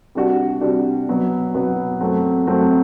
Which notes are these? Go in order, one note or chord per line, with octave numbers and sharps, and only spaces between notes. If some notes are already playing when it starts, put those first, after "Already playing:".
C3 G3 D4 F#4
C3 G3 D4 F#4
B2 F#3 B3
B2 F#3 B3
F#2 F#3 A3 C4
F#2 F#3 A3 C4